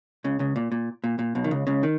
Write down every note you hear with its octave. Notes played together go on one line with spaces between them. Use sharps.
C#2 C#3
C#2 C#3
A#2
A#2
A#2
A#2
B1 B2
D#3
C#2 C#3
C#2 C#3
D#3